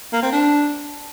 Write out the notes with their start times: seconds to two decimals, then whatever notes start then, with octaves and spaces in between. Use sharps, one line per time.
0.13 A#3
0.23 C4
0.32 D4